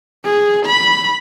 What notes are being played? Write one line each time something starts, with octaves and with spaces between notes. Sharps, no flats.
G#4
B5